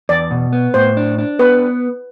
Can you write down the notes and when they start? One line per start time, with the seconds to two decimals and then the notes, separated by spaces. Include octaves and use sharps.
0.09 E2 D5
0.31 B2
0.53 B3
0.74 A2 C5
0.97 D4
1.18 D4
1.39 B3 B4